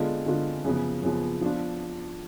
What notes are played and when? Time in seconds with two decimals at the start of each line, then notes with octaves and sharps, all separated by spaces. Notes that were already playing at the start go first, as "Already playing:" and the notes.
Already playing: D3 G#3 B3 D4 F4
0.26 D3 G#3 B3 D4 F4
0.64 F#2 C#3 F3 B3
1.02 F#2 C#3 F3 B3
1.41 F3 B3 D4 F4